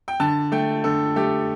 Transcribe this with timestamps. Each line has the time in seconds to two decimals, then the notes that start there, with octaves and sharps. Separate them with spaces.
0.08 G5
0.20 D3 A5
0.52 A3 G5
0.84 D3 A4
1.16 A3 G4